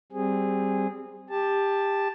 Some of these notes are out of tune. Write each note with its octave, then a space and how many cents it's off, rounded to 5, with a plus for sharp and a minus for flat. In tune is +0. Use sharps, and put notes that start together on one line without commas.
G3 -10 C4 +0 G#4 -15
G4 +20 A5 +0